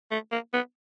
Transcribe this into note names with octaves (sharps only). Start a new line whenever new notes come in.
A3
A#3
B3